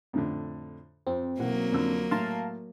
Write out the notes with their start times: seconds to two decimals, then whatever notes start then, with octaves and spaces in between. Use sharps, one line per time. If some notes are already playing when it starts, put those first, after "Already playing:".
0.13 F2 A2 D3
1.07 F2 C4
1.39 B1 E3 F#3 A#3 F#5
1.72 F2 D3 E6
2.11 A2 F5 A5 A#5 C6